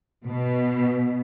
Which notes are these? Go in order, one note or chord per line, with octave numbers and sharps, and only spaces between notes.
B2